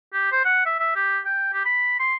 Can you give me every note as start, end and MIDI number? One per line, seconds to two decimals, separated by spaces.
0.13 0.30 67
0.32 0.41 72
0.45 0.66 78
0.66 0.75 76
0.79 0.93 76
0.96 1.19 67
1.25 1.50 79
1.53 1.63 67
1.65 1.99 83
2.00 2.15 84